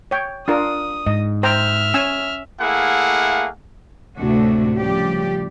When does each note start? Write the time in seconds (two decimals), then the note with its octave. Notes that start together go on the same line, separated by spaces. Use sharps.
0.11 C#5 G5
0.48 D4 F4 A#4 D#6
1.06 G#2 D#5
1.43 C5 E5 G5 A#5 F6
1.94 C#4 G#5 E6
2.60 A3 A#3 E4 G#4 F5 F#5
4.17 D2 A2 C3 A3 D4 F#4
4.77 A2 C#3 F3 G3 G4 D5